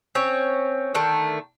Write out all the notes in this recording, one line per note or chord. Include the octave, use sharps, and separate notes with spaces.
C4 C#4 C#5
D3 D#3 A3